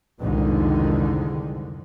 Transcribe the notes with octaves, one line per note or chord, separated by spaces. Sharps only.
C2 F2 G#2 D3 D#3 G#3